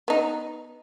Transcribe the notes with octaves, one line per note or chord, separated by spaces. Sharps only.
B3 D#4